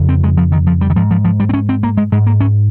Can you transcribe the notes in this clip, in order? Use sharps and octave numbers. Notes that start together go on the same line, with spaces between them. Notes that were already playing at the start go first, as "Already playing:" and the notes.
Already playing: F2 C#3
C4
G#3
F3
D#3
F3
G3
D#3
G#2 F3
F3
F3
G3
C4
C#4
C4
A#3
G#3
G#2 G#3
A#3
C#4